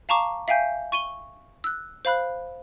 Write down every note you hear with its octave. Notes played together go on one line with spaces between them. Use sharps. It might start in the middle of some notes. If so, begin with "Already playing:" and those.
F5 A5 A#5 C#6 D6
E5 F5 G5 G#5 G6
C#6 D#7 G7
E6 F#6
C5 F5 B5 F#6